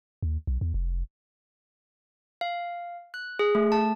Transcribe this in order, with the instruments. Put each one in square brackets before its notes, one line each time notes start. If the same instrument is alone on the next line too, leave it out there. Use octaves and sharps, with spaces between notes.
[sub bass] D#2
B1
E2
F1
[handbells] F5
F#6
G#4
A3
A5